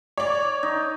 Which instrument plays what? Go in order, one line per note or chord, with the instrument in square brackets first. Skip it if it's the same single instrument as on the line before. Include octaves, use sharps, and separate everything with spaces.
[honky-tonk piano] C#5 D5
[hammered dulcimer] D#4